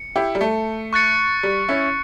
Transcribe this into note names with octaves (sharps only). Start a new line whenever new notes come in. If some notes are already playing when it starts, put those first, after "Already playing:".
Already playing: C#7
E4 G4
G3
A3
C#6 F#6 A6 C#7
G3
C#4 E4